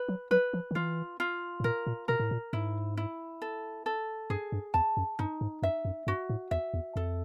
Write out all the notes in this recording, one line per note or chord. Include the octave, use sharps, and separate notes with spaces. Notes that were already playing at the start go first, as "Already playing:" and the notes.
Already playing: B4
F#3
F#3 B4
F3
D#3
E3 F4
F4
A2
A#2 A#4
A#2
B2 A#4
A2
A#2
G#2 E4
E4
A4
A4
G2 G#4
G2
E2 A5
F#2
G2 D#4
G#2
F#2 E5
F#2
G2 F#4
A2
E2 E5
E2
F2 A4